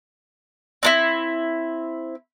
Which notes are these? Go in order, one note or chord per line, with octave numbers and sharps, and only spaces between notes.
C4 D4 E4